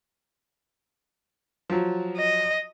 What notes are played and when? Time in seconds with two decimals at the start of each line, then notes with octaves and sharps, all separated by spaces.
1.70 F3 F#3
2.18 D#5